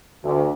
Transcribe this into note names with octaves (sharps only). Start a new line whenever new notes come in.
D2